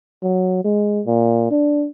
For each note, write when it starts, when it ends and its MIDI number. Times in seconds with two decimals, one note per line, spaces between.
0.23 0.62 54
0.64 1.01 56
1.07 1.48 46
1.51 1.86 62